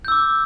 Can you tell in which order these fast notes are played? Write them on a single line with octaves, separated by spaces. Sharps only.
G6 E6 D6